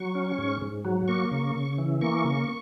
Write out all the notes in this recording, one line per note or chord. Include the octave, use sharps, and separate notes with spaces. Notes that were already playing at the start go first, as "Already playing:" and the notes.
Already playing: F#3 C#6
C#4
G#2
G#2
F#3
A#3 C#6
C#3
C#3
E3
A#3 C#6
C#3